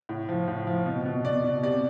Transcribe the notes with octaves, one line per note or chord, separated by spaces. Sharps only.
A2
F3
A2
F3
B2
B2
B2 D5
B2
C3 D5